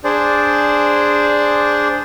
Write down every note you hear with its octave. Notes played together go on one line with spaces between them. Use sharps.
D4 G#4 C5 D5